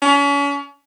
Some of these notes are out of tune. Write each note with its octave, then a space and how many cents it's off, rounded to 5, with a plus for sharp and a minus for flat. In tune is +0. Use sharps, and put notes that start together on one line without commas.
C#4 +40